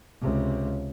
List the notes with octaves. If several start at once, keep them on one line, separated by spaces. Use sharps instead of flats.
C#2 C3